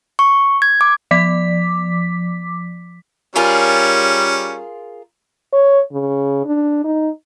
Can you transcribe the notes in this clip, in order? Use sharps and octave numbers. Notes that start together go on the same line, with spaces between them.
C#6
G#6
D6
F3 D6 B6
G3 C#4 F4 G#4 A#4
C#5
C#3
D4
D#4